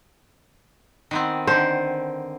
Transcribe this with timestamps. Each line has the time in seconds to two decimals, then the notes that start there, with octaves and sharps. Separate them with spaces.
1.11 D#3 B3 C4
1.47 D3 D#3 C5